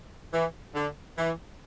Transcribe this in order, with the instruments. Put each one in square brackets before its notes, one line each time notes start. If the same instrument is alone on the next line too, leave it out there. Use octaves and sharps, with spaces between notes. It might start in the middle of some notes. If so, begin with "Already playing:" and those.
[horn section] E3
D3
E3